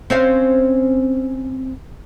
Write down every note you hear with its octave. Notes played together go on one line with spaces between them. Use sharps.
C4 C#4 F5